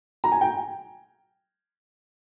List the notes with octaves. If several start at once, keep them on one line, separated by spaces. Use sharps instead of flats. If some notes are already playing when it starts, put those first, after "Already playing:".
A#5
G#5
G5